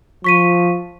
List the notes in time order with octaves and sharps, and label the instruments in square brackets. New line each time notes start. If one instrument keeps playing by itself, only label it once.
[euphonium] F3 [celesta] C#6 B6 D#7